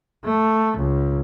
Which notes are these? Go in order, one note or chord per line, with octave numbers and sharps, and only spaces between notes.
A3
C#2